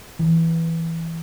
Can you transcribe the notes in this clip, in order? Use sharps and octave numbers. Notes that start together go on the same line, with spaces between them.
E3